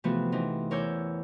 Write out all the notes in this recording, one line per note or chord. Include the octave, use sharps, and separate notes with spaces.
C3 E3 F3 A3 B3 F#4
E3 C4 D#4
E2 A#4 C#5 D6 E6 G6